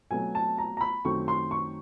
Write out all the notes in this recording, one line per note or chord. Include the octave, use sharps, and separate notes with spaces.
B2 F#3 A3 C4 G#5
A5
A#5
A#5
B5
F#2 D#3 F#3 A3 C4 C#6
C6
C#6